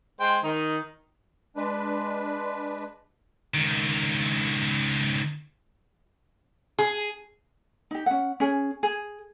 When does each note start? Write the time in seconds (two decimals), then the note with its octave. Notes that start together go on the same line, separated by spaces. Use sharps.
0.20 G#3 C5 G5
0.44 D#3 D#4
1.56 G#3 D4 B4
3.54 C#2 D#3
6.79 G#4
7.91 D#4 G4
8.06 C#4 F#5
8.40 C#4 G#4
8.83 G#4